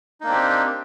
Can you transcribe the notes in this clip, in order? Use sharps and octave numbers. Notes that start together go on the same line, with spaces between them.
A#3 C4 D4 D#4 G4